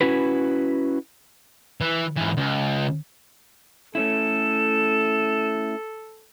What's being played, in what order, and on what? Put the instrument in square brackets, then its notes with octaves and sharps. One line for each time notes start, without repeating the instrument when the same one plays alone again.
[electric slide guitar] C#4 E4 F#4 B4
[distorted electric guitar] E3
G#2 E3
C#2
[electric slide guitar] A3 C#4 E4 [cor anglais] A4 [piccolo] E7